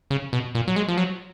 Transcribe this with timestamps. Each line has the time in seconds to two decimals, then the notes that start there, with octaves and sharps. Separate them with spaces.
0.10 C#3
0.33 B2
0.55 A#2
0.68 F#3
0.76 G#3
0.88 F3
0.97 F#3